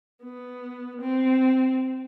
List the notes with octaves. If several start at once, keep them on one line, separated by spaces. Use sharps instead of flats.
B3
C4